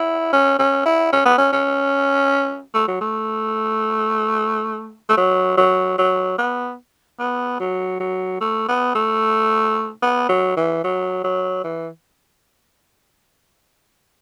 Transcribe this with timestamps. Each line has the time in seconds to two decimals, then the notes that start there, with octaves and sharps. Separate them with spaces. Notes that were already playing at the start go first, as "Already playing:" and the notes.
Already playing: E4
0.33 C#4
0.59 C#4
0.86 E4
1.13 C#4
1.26 B3
1.38 C#4
1.53 C#4
2.74 A3
2.88 F#3
3.01 A3
5.09 A3
5.18 F#3
5.57 F#3
5.98 F#3
6.38 B3
7.19 B3
7.60 F#3
8.00 F#3
8.41 A3
8.68 B3
8.95 A3
10.02 B3
10.29 F#3
10.57 E3
10.84 F#3
11.24 F#3
11.64 E3